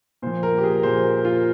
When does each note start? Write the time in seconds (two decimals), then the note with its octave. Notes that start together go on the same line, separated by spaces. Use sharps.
0.22 A#2 F3 C5
0.43 A#4
0.58 G4
0.64 G#4
0.83 A#2 F3 C5
1.04 A#4
1.25 F4